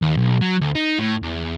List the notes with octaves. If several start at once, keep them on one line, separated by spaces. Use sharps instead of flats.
D#2
B1
F#3
D2
D#4
A2
E2